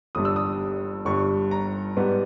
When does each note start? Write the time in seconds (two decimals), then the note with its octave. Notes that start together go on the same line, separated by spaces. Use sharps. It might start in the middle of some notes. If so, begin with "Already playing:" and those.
0.15 G1 G2 G3 D#6
0.25 E6
0.36 D#6
1.05 G1 G2 G3 C#6
1.51 A#5
1.97 G#2 G3 B3